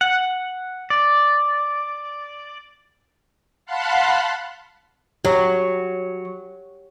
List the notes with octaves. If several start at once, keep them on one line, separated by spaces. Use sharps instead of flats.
F#5
D5
F5 F#5 A5 B5 C6 F#6
F#3 G4 C#5